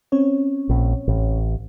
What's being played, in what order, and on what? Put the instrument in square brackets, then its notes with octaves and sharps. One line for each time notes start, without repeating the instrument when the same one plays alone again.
[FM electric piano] C4 C#4 C#5
[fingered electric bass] A#1
A1